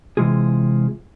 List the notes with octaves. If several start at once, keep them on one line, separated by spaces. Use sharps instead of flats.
C3 E3 G#3 F4 G#4